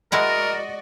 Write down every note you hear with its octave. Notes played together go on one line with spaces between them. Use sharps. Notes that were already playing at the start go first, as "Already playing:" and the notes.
G#3 E4 F#4 A#4 D5 D#5 F#5